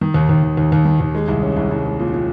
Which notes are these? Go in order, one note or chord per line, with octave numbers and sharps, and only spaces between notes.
D#3
D#2
D#2
D#2
D#2
D#2
D#3
D#2
G#3
C2
C#4
C2
C2
G#3
A#2
A#2